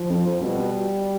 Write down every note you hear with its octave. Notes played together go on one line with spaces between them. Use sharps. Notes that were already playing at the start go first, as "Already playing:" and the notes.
Already playing: F3
F2
F2
B2 G3